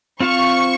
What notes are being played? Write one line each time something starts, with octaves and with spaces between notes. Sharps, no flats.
C4 F4 C5 F5 C#6